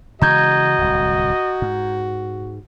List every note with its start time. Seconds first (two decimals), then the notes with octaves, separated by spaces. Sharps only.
0.22 C#3 E3 G#3 F#4 D#5 A#5 G6 G#6
0.78 D1 C2
1.62 G#2